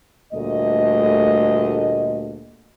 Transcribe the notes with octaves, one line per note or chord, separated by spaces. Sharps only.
D2 A#2 G3 A3 D#5